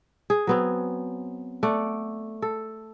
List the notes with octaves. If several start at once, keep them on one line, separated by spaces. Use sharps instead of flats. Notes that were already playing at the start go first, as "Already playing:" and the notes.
G#4
F#3 B3 C4
A3 D5 F#5
A4